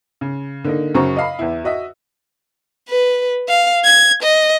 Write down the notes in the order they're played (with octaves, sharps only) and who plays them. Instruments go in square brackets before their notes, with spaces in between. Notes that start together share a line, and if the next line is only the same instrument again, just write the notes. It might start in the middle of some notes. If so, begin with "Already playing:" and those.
[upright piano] C#3
D3 A#3 D#4
F#2 C#3 F#4 C5 A#5 C#6
D#5 F5 B5
E2 E4
F#4 D#5 E5
[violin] B4
F5
G#6
D#5